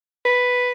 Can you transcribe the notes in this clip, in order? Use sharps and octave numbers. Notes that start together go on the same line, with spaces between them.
B4